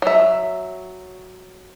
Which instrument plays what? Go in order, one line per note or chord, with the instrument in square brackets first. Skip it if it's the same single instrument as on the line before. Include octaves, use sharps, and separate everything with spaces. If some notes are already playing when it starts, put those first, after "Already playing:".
[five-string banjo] F#3 E5